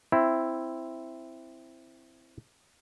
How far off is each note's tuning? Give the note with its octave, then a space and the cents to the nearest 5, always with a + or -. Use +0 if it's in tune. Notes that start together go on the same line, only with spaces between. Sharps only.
C4 +0 E4 +5